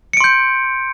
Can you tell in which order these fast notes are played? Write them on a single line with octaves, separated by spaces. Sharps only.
C#7 D7 C6 G6